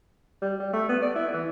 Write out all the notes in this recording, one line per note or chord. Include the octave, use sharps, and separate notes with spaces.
G3
G3
A3
B3
D5
E4
E3